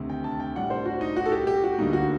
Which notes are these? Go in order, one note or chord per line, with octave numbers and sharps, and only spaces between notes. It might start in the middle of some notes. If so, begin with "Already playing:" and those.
Already playing: D2 C3 D#3
G5
A5
G5
A2 G3 D4 F#5
C5
F#4
D#4
F#4
A4
G4
G4
F#4
D2 D3 G3 A#3 D#4
F#4